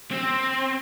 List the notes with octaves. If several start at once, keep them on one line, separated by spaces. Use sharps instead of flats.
C4